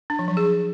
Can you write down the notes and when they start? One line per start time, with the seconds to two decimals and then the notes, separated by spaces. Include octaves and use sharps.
0.10 D4
0.19 F3
0.28 F#3
0.37 G#4